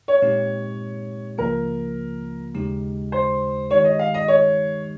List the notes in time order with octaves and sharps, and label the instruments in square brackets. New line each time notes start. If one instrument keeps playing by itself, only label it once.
[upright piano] C#5
[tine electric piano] A#2 G#3 C4 D#4 G4
[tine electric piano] C#2 C#3 F3 A#3 F4 [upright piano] A#4
[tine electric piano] D#2 C#3 G#3 D#4 G4
[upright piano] C5
[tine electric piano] D#3 G#3 D#4 G4 [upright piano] C#5
[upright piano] D#5
F5
D#5
C#5